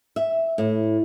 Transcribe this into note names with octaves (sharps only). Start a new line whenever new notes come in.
E5
A2